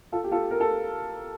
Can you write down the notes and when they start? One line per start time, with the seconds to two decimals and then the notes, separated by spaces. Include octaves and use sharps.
0.12 F4 A4
0.24 G4
0.31 F4 A4
0.51 A#4
0.60 A4